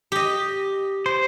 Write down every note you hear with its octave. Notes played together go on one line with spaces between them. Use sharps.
G4 D#5
C5